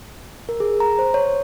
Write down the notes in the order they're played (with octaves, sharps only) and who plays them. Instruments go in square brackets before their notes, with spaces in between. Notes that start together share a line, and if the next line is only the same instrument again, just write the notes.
[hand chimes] A#4
G#4
A#5
C5
C#5